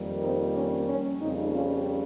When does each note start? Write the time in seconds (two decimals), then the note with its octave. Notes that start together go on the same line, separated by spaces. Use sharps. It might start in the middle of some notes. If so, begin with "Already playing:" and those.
Already playing: F2 D#3 G3 A#3
0.22 C4 D#4
0.55 C#4
0.89 C#4
1.21 F2 C#3 G3 A#3 C4 D#4
1.54 C#4 F4